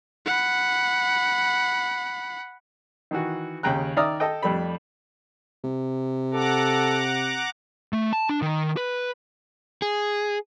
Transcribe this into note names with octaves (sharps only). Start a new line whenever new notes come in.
F#5 B5
D#3 E3 F#4
D#2 C#3 G5 A#5 F#6
D#3 D5 E5 A#5 D#6 F6
A4 D#5 G5
F2 G3 A3 G4 B5
C3
A4 F#5 A#5 D6
A3
A5
D4
D#3
B4
G#4